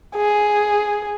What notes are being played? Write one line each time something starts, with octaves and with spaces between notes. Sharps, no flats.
G#4